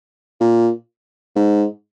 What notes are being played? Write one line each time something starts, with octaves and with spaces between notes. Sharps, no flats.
A#2
G#2